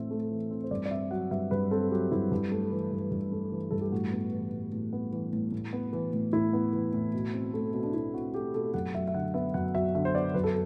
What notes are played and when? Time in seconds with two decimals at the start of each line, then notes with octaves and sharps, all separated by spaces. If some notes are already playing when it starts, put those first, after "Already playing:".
Already playing: A2 E3 A3 C4 E5
0.11 A3
0.31 E3
0.51 C4
0.64 C5
0.71 G2 D5
0.85 D5
0.91 C4 E5
1.11 F#3 F#5
1.31 G2 E5
1.51 G2 B4
1.71 C4 A4
1.91 F#3 G4
2.11 G2 E4
2.32 G2
2.52 A3
2.72 E3
2.92 G2
3.12 G2
3.32 A3
3.52 E3
3.71 G2 A4
3.81 G4
3.92 A2 F#4
4.12 B3
4.32 E3
4.52 A2
4.72 A2
4.93 B3
5.12 E3
5.33 A2
5.52 A2
5.73 B3
5.93 E3
6.13 A2
6.33 A2 E4
6.53 B3
6.73 E3
6.94 A2
7.14 B2
7.34 C4
7.53 A3
7.74 B2
7.83 D4
7.94 B2 E4
8.14 C4 F#4
8.33 A3 G4
8.54 B2 A4
8.74 F#2 F#5
8.94 F#3 E5
9.07 E5
9.14 D3 F#5
9.34 B3 E5
9.54 F#2 F#5
9.74 F#3 E5
9.95 D3 E5
10.05 C5
10.15 B3 D5
10.34 F#2 B4
10.44 A4